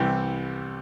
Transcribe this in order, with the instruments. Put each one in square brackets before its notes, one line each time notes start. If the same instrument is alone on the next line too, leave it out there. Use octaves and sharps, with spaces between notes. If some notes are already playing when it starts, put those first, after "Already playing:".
Already playing: [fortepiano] C2 C3 E3 G3 G4